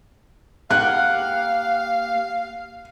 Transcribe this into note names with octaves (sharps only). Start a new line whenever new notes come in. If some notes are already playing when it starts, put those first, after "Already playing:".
A#3 G4 F5 F#5 F#6